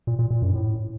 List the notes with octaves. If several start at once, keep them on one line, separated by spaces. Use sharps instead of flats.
A#2
A#2
A#2
F#2
A2